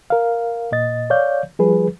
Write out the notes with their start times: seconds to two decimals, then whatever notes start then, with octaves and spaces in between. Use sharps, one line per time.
0.10 A#4 F5
0.72 A#2 D#5 A6
1.10 C#5 D5 F5 G6
1.59 F3 G3 G#4 B4